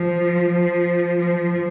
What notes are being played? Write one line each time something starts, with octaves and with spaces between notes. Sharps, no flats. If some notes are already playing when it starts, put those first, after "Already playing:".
Already playing: F3
F3
F3